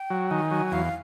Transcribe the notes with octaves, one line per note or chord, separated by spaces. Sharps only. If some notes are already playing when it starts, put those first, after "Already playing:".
Already playing: G5
F#3
D#3 G#5
F#3
E2 F5